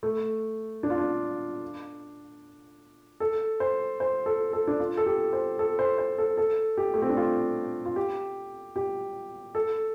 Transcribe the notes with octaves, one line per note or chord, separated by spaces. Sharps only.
A3
D4
F4
D4
A4
C5
C5
A4
A4
D4
F4
A4
G4
C5
A4
C5
C5
A4
A4
G4
A3
C4
D4
F4
F4
G4
G4
A4